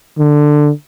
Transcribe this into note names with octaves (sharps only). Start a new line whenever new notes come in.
D3